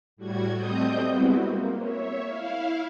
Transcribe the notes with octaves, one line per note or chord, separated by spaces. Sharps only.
A2 G3 F#4 G#6
G3 A3 C4 D#5 D#6 G6
G3 G#3 B3 C4 E4 F#4
A#3
C#5 E5
E4 F5